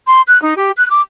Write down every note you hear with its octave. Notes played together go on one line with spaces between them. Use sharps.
C6
F#6
D#4
G4
F#6
D6